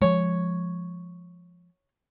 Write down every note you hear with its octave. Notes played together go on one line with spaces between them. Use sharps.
F3 G#3 C#5